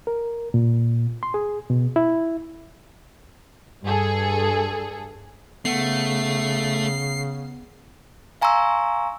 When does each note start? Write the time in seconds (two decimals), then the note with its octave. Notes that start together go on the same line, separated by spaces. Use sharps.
0.07 A#4
0.54 A#2
1.23 C6
1.34 G#4
1.70 B2
1.96 E4
3.84 G2 G#4 A4
5.65 C#3 A3 B3 F#5 C7
8.41 F5 G#5 A#5 C6 C#6 E6